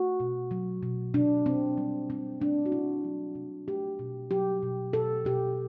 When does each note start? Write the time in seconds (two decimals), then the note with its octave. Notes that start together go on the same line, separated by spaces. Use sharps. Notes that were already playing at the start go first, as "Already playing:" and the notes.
Already playing: A3 F#4
0.20 B2
0.51 F#3
0.83 B2
1.14 C3 D4
1.46 C3 C4
1.77 G3
2.10 G3 C4
2.40 A3 D4
2.66 F#4
2.72 C3 E4
3.04 F#3
3.35 C3
3.68 A3 G4
3.99 B2
4.31 F#3 G4
4.63 B2
4.93 B2 A4
5.25 B2 G4